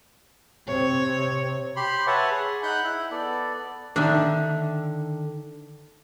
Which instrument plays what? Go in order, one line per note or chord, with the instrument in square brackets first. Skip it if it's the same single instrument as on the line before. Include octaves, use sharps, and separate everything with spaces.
[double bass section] C3 C4 [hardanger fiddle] C#5
[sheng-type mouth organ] G4 B5 C6
B4 C#5 E5 F#5 A5 C#6
G#4
D#4 F#5 B5 F#6 G6
E4
B3 A4 D5
[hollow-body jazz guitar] D3 D#3 [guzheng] D4 E5